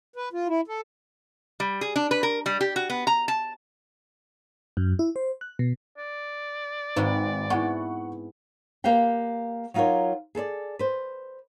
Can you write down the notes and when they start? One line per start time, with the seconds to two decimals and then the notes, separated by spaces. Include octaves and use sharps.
0.16 B4
0.33 F4
0.48 E4
0.68 A4
1.60 G3
1.81 G#4
1.96 D4
2.11 B4
2.23 A#4
2.46 G3
2.61 G4
2.76 F#4
2.90 B3
3.07 A#5
3.28 A5
4.77 F#2
4.99 E4
5.16 C5
5.41 F#6
5.59 B2
5.98 D5
6.96 G#1 G#2 G#3 C4 F#4 B4
7.50 G#3 B3 E4 F#5 C#6
8.84 A#3 G4 B4 F5 G5
9.74 F#3 D#4 F4 G4 A#4 C#5
10.35 G#4 A4 C5 D5
10.79 B4 C5